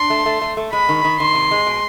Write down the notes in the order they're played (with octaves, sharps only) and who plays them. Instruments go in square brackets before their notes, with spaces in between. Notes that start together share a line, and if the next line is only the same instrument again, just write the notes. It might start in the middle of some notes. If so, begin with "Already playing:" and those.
Already playing: [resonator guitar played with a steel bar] D4 [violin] C6
[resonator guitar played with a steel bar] A3
A3
A3
A3
[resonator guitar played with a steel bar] G#3 [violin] B5
[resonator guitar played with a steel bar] D#3
D#3
[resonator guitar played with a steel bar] D#3 [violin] C6
[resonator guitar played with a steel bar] C3
G#3
B2